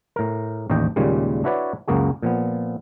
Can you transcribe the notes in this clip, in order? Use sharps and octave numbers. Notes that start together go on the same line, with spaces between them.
A2 A#4
A1 D#2 D4 D#5 G5
D#2 A#2 C#3 G3 G#3
D4 E4 F#4 B4 C#5 D5
C#2 F#2 A#3 F#4 G#4
A#2 F3 B3